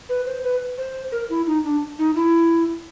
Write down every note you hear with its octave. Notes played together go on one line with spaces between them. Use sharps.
B4
C5
B4
C5
A#4
E4
D#4
D4
D#4
E4